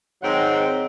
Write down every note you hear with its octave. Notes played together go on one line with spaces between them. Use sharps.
G#2 D#3 F#3 C4 D#5 F#5